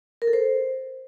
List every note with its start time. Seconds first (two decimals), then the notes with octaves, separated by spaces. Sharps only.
0.22 A#4
0.27 A4
0.33 C5